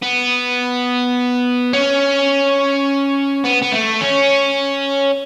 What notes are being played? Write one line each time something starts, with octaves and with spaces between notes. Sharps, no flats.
B3
C#4
B3
B3
A3
C#4